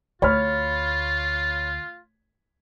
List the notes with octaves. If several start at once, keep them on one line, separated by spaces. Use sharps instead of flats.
D2 F4 C#5 B5 F6